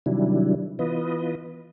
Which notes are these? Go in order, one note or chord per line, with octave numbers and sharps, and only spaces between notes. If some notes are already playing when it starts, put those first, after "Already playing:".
C3 D#3 F#3 G3 D4 E4
E3 B3 F4 B4 D#5